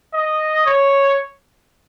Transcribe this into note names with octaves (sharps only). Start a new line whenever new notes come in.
D#5
C#5